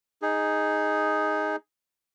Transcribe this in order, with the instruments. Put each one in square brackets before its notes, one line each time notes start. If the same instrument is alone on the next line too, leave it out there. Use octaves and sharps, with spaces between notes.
[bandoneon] D#4 G#4